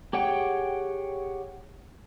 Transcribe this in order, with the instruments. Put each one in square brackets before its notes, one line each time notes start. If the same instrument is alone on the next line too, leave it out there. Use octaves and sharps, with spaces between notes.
[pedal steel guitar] G4 G#4 C#5 F#5 G5